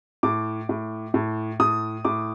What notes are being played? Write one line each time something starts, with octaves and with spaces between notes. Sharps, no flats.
A2 D6
A2
A2
A2 D#6
A2 D6